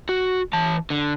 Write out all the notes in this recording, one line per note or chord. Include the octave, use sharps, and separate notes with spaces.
F#4
E3 A5
D3